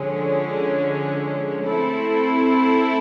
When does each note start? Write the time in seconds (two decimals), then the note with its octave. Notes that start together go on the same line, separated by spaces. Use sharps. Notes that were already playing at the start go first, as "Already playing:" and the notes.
Already playing: D3 F3 G#3 C#4
1.64 A3 C4 E4 A4